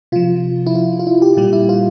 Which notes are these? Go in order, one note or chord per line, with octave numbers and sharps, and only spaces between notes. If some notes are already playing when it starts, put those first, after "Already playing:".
C3 F3 F4
E4
F4
F4
E4
G4
A#2 G3 G4
E4
F4